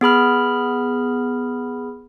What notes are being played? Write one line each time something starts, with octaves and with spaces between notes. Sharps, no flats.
B3 G#4 B5 F6